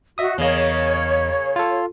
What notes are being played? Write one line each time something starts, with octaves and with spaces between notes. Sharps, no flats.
F#4 D#5 E5 D#6
E2 C#3 A#3 C#5 D#5
F4 A4